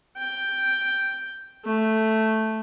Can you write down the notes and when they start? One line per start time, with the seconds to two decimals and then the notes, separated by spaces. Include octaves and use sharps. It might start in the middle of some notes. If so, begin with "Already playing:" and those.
0.17 G5
1.66 A3